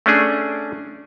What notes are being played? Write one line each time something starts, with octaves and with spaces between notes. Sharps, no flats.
A3 C#4 D4 G#4